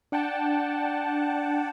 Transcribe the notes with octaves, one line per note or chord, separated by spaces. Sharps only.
D4 F#5 G5 A5